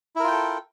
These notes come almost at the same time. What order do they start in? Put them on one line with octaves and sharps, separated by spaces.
E4 A#4 F4 G5 A4